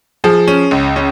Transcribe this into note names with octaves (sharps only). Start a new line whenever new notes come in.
F3 G#4
C#4
C#2
C#4